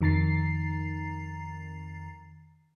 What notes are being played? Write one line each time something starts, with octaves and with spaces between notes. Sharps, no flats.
F2 D#3 A#5 A6 C7